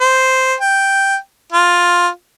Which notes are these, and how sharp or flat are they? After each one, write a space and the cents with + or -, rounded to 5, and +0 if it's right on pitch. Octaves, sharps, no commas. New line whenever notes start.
C5 -5
G5 +0
F4 +10